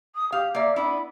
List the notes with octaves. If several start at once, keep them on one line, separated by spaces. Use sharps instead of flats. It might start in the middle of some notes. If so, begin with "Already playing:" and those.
D#6
G4 F5
A#3 D5 E5
B3 D4 E4 B5